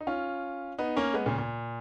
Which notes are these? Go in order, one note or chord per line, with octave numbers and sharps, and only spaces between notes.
D#4
C#4 F4
B3 D#4
A#3 C#4
G#3 B3
A#2 C#3
A#2